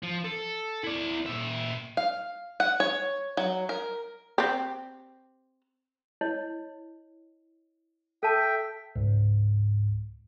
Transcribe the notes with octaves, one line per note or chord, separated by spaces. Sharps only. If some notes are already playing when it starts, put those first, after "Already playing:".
F3
A4
E4 D5
A#2 E5
F5
F#5
C#5
F#3
A#4
C4 G4
E4 C#5 D#5
A4 E5 G5 A5
C#2 G#2